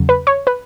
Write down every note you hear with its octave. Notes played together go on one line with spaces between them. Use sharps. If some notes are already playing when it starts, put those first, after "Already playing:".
Already playing: E2 C#3 F#3
B4
C#5
B4